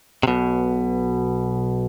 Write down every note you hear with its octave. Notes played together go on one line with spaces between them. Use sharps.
C3
B1 B2